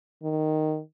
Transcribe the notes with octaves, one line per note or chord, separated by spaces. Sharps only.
D#3